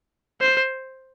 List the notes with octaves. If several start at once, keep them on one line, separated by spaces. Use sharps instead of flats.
C5